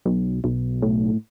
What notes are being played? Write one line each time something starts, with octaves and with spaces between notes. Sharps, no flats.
B1
B1
A2